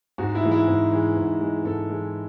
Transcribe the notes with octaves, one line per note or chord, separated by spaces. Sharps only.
G#2 F#4
E4
E3 G#3
E4
G#2
E3 G#3
G#2
E3 G#3
G#2 A4
E3 G#3